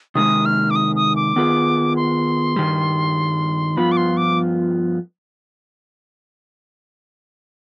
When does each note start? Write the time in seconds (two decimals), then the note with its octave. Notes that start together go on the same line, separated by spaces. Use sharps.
0.15 C3 D#3 G#3 D#6
0.46 F6
0.70 D6
0.76 D#6
0.96 D#6
1.16 D6
1.36 D#3 B3 F4 G#4 B4
1.96 C6
2.56 G2 D#3 G3
3.77 G2 F3 B3 F4 B5
3.92 D6
3.97 C6
4.17 D6